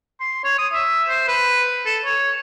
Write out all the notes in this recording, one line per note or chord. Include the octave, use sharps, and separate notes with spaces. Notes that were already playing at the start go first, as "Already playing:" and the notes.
C6
C#5
D#6
E5
C5
B4
A4
C#5